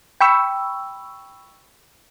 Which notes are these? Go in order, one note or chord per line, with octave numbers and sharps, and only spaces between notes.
G5 B5 C#6 E6